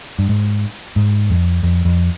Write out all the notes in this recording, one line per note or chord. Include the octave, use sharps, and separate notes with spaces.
G2
G#2
G#2
F2
F2
F2